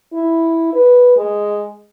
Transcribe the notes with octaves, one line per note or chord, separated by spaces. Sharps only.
E4
B4
G#3